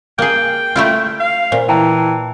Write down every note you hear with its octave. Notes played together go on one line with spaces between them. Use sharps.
A#3 G#4 G5
A3 E4 F4
F5
A#2 C5
E3 G5 A5 A#5